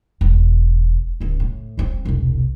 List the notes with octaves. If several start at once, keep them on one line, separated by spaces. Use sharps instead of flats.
E1
D1 C#2
A2
D#1 C4
E1 C2